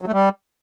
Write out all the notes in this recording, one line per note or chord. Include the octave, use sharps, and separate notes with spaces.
F#3
A3
G3